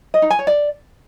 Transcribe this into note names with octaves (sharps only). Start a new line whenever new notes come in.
D#5
D#4
G#5
C#5
D5